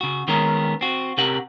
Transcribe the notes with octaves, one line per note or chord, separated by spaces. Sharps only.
C#3 F#4
D#3 G#3 B3 C#4 A#4
C4 F#4
C3 C#4 G4 A#4 F#5